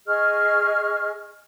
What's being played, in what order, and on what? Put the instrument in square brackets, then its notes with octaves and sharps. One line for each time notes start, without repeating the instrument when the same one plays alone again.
[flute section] G#4 D#5 C#6 F6